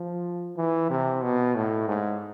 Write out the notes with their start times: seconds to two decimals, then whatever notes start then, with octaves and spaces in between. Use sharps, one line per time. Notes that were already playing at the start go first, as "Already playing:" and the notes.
Already playing: F3
0.57 E3
0.90 C3
1.23 B2
1.55 A2
1.88 G#2